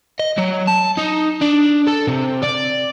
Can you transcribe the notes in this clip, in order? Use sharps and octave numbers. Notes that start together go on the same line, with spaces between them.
D#5
F#3
A5
D#4
D4
A4
C3
D5